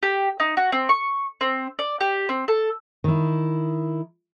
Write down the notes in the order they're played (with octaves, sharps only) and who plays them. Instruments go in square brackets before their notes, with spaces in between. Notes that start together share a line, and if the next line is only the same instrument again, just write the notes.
[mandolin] G4
D#4
F#4
C4
C#6
C4
D5
G4
C4
A4
[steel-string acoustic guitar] D#3 E4